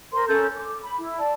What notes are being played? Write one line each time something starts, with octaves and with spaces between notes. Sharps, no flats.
A#4 C5 C6
C#4 A4 A#4 G6
D6
B5
E4
D5 A5